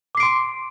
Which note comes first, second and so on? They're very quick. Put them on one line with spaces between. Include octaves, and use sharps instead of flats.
D6 C7 D7 C6